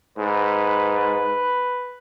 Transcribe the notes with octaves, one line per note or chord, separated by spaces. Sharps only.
G#2 B4